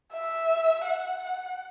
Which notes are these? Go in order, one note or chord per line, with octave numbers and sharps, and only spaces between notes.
E5
F#5